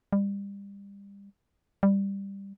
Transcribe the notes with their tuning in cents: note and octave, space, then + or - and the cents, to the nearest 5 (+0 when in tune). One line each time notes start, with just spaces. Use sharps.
G3 +30
G3 +10